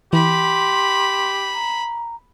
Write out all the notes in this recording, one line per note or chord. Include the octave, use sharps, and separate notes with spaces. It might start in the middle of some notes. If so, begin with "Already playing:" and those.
E3 G4 B5 C6
A#5